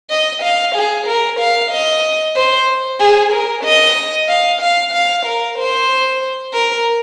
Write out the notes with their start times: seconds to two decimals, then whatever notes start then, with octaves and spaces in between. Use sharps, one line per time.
0.10 D#5
0.42 F5
0.75 G#4
1.07 A#4
1.39 F5
1.71 D#5
2.36 C5
2.99 G#4
3.32 A#4
3.64 D#5
4.28 F5
4.61 F5
4.93 F5
5.25 A#4
5.58 C5
6.54 A#4